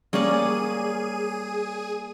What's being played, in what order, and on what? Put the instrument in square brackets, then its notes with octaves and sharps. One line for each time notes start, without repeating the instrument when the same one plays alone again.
[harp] G3 A#3 [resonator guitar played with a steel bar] C#4 D5 [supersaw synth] G#4 D#7